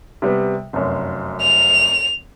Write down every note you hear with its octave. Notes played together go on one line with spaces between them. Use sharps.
C3 G3 B3
F1 F#2
F7